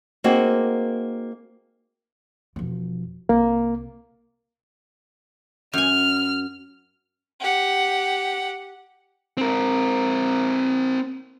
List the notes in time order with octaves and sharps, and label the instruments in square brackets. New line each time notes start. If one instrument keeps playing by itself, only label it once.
[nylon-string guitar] A#3 C4 D#4 F#4 G#4
[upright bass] E1 F3
[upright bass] C2 [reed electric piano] A#3
[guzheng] F#2 G#5 [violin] F6
[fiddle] G4 F#5
[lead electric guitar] C4 A#4